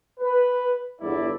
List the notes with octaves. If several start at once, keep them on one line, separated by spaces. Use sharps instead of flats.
B4
G1 E2 E4 D5